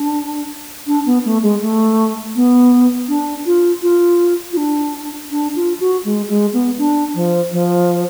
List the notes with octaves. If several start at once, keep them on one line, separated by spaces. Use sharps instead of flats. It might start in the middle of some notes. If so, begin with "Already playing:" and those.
Already playing: D4
D4
B3
A3
G#3
A3
B3
D4
F4
F4
F4
D4
D4
F4
F#4
G#3
G#3
B3
D4
F3
F3